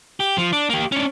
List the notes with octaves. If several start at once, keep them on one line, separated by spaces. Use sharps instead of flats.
G4
F3
D4
A#3 G4
C#4 D4